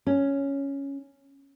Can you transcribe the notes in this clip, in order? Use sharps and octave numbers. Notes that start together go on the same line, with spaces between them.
C#4